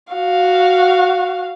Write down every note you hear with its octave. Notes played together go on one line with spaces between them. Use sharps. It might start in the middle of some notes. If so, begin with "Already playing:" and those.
F#4 F5